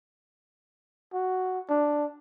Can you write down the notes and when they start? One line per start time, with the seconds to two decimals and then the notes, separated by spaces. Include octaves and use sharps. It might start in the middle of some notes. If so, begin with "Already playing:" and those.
1.14 F#4
1.69 D4